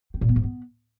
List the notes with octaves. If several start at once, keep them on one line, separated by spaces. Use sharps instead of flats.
C4
A#2
B3
G#2
B3